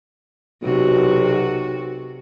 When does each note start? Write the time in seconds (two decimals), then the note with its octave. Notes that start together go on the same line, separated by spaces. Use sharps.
0.63 B1 C3 F#4